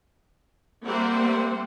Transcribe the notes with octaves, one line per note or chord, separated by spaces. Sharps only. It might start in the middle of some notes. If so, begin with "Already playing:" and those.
G3 A#3 C4 C5 E5 F#5